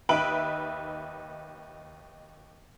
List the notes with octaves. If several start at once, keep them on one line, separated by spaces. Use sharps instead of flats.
D#2 D#4 B4 E5 D7 F#7